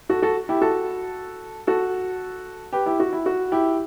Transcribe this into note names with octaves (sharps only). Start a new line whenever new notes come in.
F#4 A4
F#4 A4
E4 G4
F#4 A4
F#4 A4
G4 B4
E4 G4
F#4
E4
F#4
E4 G4